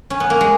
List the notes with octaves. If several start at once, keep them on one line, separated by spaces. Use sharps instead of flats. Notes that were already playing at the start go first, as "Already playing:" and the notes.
C#4
B3
A#3
G#3